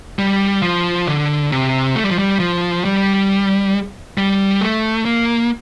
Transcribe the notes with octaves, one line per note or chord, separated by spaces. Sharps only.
G3
F3
D3
C3
A3
G3
F3
G3
F3
G3
G3
A3
A#3